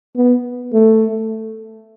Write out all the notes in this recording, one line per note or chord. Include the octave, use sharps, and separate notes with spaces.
B3
A3